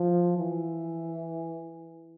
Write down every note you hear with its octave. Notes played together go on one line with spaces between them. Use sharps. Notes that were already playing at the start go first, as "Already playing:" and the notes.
Already playing: F3
E3